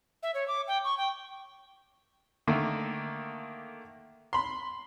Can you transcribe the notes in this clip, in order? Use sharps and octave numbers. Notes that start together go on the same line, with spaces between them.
E5
C#5
D6
G5
C#6
G5
D3 D#3 A3 A#3
B5 C6